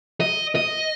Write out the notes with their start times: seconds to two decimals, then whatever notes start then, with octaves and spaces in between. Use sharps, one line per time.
0.20 D#5
0.55 D#5